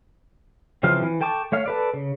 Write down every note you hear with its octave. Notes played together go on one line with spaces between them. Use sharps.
C#3 E3 F3 C4 F5
E3
A4 G5 A5 C#6 D6
A3 C#5 F5
A4 B4 D5
C#3